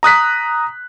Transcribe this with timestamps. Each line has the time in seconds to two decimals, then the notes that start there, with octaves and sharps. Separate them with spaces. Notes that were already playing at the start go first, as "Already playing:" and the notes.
0.03 A#5 D#6 F#6 B6